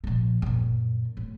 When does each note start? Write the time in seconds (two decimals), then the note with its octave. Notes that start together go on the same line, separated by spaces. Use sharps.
0.04 A#2 F3
0.42 F#2 A#2
1.17 A2